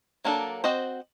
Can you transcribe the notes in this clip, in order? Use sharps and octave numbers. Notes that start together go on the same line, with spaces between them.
F#3 A#3 D4 A4
C4 F#4 C5 D#5